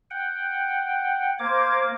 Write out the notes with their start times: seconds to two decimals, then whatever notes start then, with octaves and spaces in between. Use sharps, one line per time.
0.10 F#5 G5
1.39 A#3 C5 D6 G#6